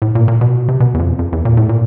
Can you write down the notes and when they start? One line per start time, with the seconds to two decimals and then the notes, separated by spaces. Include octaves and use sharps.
0.02 A2
0.15 A#2
0.28 A#2
0.41 B2
0.68 C3
0.80 B2
0.94 E2
0.99 F2
1.19 F2
1.32 E2
1.45 A#2
1.57 A2
1.69 A#2